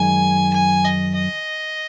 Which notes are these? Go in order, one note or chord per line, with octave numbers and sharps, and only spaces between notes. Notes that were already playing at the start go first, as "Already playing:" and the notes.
Already playing: F#2 D#3 G#3 D#4 G#5
G#5
D#5
D#5